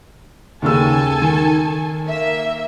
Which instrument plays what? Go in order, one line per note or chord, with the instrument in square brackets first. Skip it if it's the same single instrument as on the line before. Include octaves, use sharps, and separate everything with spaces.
[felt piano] D#2 C#3 E6 [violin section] A4 G#5
[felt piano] D#3
[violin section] A#3 E5